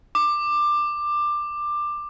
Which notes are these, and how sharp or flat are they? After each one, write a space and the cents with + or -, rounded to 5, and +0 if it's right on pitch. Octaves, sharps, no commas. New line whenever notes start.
D6 +15